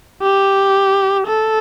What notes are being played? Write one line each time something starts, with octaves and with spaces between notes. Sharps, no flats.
G4
A4